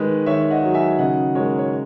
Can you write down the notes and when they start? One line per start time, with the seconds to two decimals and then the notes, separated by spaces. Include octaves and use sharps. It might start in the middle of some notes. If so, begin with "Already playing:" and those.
Already playing: D#3 G#3 B4 D#5
0.26 D#3 C#5 E5
0.50 D#5 F#5
0.62 F#3
0.74 E5 G#5
0.99 C#3 D#5 F#5
1.35 G#3 A#4 C#5
1.58 C#5